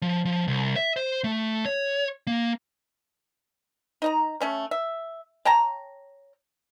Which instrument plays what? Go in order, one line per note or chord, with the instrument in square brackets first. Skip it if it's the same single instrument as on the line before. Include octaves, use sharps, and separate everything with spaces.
[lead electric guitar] F3
F3
C2
E5
C5
A3
C#5
A#3
[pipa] D#4 D#5 A#5
A3 C#4 C#5
E5
C#5 G5 A5 A#5